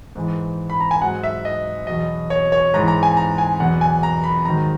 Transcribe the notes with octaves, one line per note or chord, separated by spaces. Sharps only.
G#2 E3
B5
A#5
G#5
G#2 F#3 F#5
E5
D#5
E2 B2 F#3 D#5
C#5
C#5
G#2 E3 A#5
A#5
G#5
A#5
G#5
E2 B2 F#3 F#5
G#5
A#5
B5
G#2 D#3 F#3 A#5